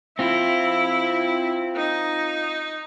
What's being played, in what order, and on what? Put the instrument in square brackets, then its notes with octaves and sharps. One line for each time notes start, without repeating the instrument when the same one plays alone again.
[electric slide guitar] C4 F4 [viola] E4
[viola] D#4